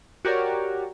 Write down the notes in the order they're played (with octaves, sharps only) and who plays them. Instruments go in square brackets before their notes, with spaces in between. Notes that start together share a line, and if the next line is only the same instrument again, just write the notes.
[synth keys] F#4 G4 A#4 C#5 D5